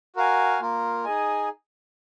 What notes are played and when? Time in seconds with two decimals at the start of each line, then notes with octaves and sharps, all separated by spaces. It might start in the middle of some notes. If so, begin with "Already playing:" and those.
0.16 F#4 A#4 F5 G#5
0.60 A#3 F4 A#4
1.04 D#4 G#4 D#5 G#5